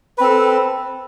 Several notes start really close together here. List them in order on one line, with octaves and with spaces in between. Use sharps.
B4 C4 A4